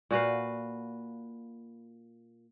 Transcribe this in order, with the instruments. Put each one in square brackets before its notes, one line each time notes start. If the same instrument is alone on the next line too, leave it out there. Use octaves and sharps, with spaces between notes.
[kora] A#2 F#4 B4 F5